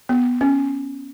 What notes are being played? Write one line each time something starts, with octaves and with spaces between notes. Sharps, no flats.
B3
C#4